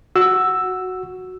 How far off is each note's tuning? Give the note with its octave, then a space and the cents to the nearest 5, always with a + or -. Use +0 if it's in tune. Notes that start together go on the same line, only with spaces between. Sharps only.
F#4 +0 E6 +0